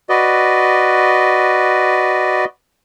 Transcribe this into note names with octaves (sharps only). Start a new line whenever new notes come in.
F#4 B4 D5 D#5